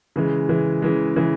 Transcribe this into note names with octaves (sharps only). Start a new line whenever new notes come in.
C#3 E3 G#3
C#3 E3 G#3
C#3 E3 G#3
C#3 E3 G#3